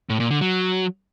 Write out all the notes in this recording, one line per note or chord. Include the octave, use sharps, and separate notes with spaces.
A2
A#2
D3
F#3